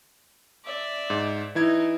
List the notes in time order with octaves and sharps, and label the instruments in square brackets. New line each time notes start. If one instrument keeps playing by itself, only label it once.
[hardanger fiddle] D5 E5
[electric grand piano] G#2
[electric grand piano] E3 E4 G#6 [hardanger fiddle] D#4